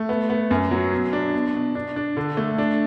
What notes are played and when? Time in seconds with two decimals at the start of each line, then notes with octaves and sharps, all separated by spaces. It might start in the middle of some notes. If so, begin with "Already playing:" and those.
Already playing: A3
0.09 B3
0.30 B3
0.51 F#2
0.71 F#3
0.93 B2
1.13 D4
1.34 B2
1.54 B2
1.75 D4
1.96 D4
2.17 D3
2.37 A3
2.58 D4